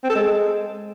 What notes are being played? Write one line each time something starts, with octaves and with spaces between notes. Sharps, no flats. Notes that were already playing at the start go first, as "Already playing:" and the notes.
C4
A4
G#3